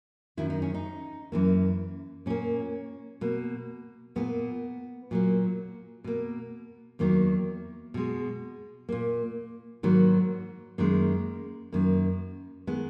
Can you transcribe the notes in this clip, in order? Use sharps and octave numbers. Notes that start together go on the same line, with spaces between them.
F#2 D#3 F#3 E4
D#4
C#4
D#4
F#2 E3 A#3
A#2 A#3 C#4
B2 A#3
A#2 A#3 B3
A#2 F#3 A#3
B2 A#3
E2 D#3 F#3 A#3
B2 G#3
A#2 A#3
G#2 D#3 F#3 A#3
F#2 D#3 G#3 A#3
F#2 D#3 A#3
D#3 G#3 B3